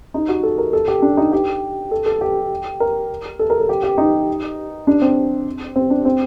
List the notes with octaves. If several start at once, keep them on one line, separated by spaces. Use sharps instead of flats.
D#4
F#4
A4
A#4
A4
G4
D4
D#4
G4
A4
A4
G4
A#4
A4
A#4
A4
G4
G4
D#4
D4
C4
C4
D4
C4